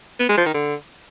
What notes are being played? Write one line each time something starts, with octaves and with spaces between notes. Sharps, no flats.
B3
G#3
F3
D#3
D3